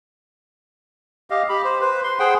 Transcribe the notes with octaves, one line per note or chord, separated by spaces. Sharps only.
G4 D#5 F5
G4 B5
C5
B4 C5
C6
G#4 C5 F#5 G5